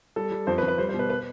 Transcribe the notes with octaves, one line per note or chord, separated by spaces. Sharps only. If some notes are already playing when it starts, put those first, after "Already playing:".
G3 A4
G3
F2 C5
B4
F2
B4
G3 C5
C5
B2
B4
B4